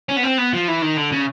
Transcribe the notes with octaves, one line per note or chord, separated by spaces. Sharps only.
C#4
B3
C4
B3
F3
E3
D#3
D3
C#3